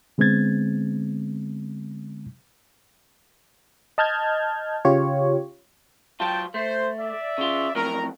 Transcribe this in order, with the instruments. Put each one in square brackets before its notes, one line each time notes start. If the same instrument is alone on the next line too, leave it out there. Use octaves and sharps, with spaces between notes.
[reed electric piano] D3 G#3 B3 C4 G#6 A6
[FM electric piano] D#5 A5 F6 G6 G#6
C#3 F4 G4 C#5
[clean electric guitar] F#3 F4 [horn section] G5 A5
[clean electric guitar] A3 [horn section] C5
[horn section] D5 E5
[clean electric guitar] C#3 F4
[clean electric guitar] F2 A2 F#3 [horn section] A#4